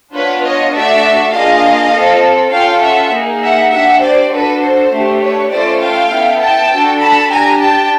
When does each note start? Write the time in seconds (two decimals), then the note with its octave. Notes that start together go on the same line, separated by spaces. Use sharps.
0.14 B3 D4 F4 B4 C#5
0.44 C#5 D#5
0.73 A3 D4 F#4 A4 D5 E5
1.33 A#3 D4 F4 G#4 D#5 F5
1.93 C4 F4 A4
2.53 C#4 F4 A4 F5 G5
2.82 E5 F#5
3.13 A#3 D#4 G#4
3.42 E5 F#5
3.72 D4 G4 E5 F#5
4.02 C5 D5
4.32 D4 F#4 A4 B4
4.62 C5
4.92 A3 D4 G4
5.21 B4 C#5
5.51 A3 C#4 F4 A4 C5 D5
5.81 F5 G5
6.12 B3 E4 A4
6.41 G5 A5
6.71 D4 F#4 A4
7.01 A5 B5
7.31 D4 G4 G#5 A#5
7.61 G5 A5